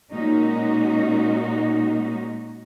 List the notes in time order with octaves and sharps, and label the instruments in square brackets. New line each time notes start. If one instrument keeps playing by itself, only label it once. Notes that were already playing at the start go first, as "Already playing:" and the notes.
[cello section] A#2 G#3 C#4 D#4 F#4